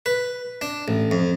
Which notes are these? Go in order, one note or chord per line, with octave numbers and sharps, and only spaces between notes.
B4
D4
A1
F2